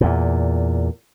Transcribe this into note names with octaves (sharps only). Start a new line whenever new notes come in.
E2 A#2